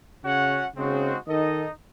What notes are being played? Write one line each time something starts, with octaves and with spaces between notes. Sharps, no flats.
C#3 C#4 F#4 C#5 F#5
C#3 G#3 C4 D#4 F#4 C5
D#3 D#4 A4 D#5